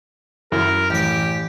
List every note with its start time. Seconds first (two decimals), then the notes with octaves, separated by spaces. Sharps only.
0.52 F#2 E4 A#4
0.90 A1 G4 B4